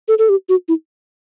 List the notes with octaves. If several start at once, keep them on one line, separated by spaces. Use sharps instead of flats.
A4
A4
G4
F#4
E4